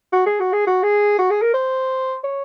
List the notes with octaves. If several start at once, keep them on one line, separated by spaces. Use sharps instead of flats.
F#4
G#4
F#4
G#4
F#4
G#4
F#4
G#4
A#4
C5
C#5